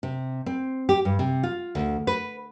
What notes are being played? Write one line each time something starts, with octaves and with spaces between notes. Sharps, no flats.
C3
C4
G4
G2
C3
F4
D2
B4